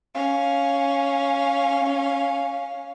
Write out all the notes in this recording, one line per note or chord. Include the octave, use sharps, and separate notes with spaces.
C#4 F5